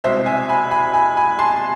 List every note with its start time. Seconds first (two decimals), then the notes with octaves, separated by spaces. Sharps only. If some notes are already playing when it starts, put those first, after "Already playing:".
0.04 C2 B2 G#3 C4 C5 E5
0.26 E5 G#5
0.49 G#5 B5
0.71 G#5 B5
0.93 G#5 B5
1.17 G#5 B5
1.39 A5 C6